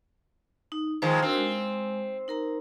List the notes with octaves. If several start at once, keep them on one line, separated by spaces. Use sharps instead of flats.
D#4
D#3 F3 G#3 C5 A5
C4 D4 F#4 A#4
G#3
D#4 A#4 A#5